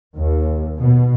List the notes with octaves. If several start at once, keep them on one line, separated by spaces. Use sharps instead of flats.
D#2
B2